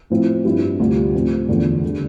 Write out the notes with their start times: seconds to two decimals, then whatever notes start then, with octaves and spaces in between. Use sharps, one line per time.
0.10 A2 F3 C4 E4
0.44 G2 F3 C4 E4 G4
0.79 D2 C3 G3 D4 F4
1.14 A2 F3 C4
1.49 E2 D3 F3 A3
1.84 D3 G3